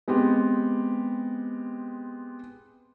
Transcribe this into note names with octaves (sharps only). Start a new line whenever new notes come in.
G#3 B3 C4 G4